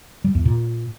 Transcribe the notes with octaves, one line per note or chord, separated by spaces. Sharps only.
G3
E2
A#2